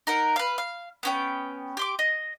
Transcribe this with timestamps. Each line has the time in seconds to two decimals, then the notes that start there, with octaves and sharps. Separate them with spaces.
0.07 D#4 A#4 F#5
0.36 B4 F5
0.58 F5
1.03 B3 C#4 G5
1.77 G4 C6 D6
1.99 D#5